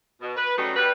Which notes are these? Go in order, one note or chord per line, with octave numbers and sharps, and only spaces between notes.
B2
B4
F#3 G3 A3 C#4 D#4
G3 B4